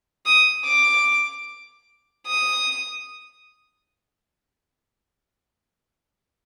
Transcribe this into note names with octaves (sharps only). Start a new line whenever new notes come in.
D#6
D6
D#6